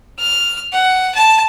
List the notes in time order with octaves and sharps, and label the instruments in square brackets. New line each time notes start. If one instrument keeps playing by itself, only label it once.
[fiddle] F6
F#5
A5